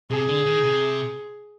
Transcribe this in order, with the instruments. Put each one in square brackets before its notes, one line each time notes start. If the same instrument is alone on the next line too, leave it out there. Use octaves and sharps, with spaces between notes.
[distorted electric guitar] C3 [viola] G#4
[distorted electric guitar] D3
D#3
C3